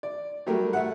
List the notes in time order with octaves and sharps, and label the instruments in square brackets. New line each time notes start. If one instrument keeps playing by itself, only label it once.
[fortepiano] D5
F#3 G3 A3 G4 A#4
A3 E5 F#5